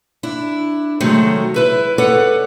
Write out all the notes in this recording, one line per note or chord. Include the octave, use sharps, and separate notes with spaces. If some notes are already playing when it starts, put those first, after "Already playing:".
D4 E4
C3 D#3 F#3 G#3 A3
E4 B4 E5
A4 B4 C#5 D5 F#5